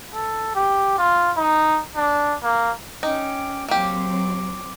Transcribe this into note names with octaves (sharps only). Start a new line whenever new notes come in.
A4
G4
F4
D#4
D4
A#3
C#4 D#4 G5 D6
F#3 A#3 C4 G4 D6